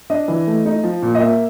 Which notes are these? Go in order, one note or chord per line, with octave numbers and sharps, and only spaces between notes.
D4 D#5
E3
A3
D#4
F3
A#2
D#5
A#3 E5